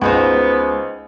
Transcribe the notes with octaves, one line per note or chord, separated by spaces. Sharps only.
C#2 B3 C4 D#4 F#4